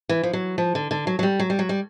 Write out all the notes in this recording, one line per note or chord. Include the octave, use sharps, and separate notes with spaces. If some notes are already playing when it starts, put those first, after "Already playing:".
E3
F3
F#3
F3
D3
D3
F#3
F#3
G3
F#3
G3
F#3
G3